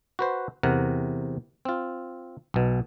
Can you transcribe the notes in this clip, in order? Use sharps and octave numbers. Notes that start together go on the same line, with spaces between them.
F#4 B4 C5
E2 C3 A#4 F#5
C4 F4
B1 B2